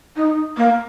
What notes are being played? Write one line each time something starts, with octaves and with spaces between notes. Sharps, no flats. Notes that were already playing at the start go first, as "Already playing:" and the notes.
D#4
A#3